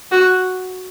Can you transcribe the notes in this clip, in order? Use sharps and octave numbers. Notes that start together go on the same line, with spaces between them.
F#4